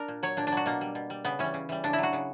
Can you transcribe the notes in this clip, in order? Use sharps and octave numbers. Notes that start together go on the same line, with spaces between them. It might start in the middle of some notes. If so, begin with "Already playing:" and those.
Already playing: D4 A#4
A#2
F#3 C#5
A#2 D4
D4
F#3 F#4
B2 A#3
G3
B2
G3
C#3 B3
E3 G3 C#4
C#3
E3 G3
C#3 D4
E4
F#3 F#4
C#3